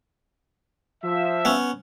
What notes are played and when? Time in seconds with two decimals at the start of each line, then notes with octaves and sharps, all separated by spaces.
1.03 F3 E5
1.45 B3 C#4